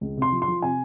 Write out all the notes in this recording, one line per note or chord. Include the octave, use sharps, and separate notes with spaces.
C#2
C3 C6
F3
C6
F3
C3 G#5